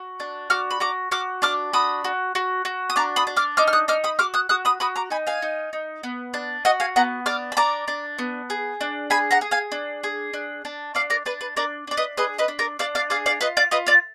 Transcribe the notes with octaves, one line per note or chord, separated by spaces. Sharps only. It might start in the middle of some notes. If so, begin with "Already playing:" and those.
Already playing: F#4
D4
F#4 D6 F6
B5
F#4 A#5 D6
F#4 D6 F6
D4 D6 F6
F#4 B5 D#6
F#4
F#4
F#4
D#6
D4 A#5 D6
B5 D#6
D4
D6 F6
D#4 D6 F6
F6
D#6 F#6
D#4 D6 F6
B5 D#6
F#4 D6 F6
D#6 F#6
F#4 D#6 F#6
B5 D#6
F#4 B5 D#6
A#5 D6
D#4 G#5 B5
F5 G#5
D#4
D#4
B3
D4
F#4 D#5 F#5
F5 G#5
B3 F#5 A#5
D4 D6 F6
B5
D4 A#5 D6
D4
B3
G#4
D4
G#4 G#5 B5
F#5 A#5
G#4
F5 G#5
D4
G#4
D4
D4
D4 D5 F5
A#4 D5
D4 B4
B4
D4 A#4 D5
D4 D5
B4 D#5
G#4 B4 D#5
B4 D#5
D4
A#4 D5
D4 D5 F5
D5 F5
G#4 D5 F5
D5 F5
F4 B4 D#5
D5 F5
F4 B4 D#5
D5 F5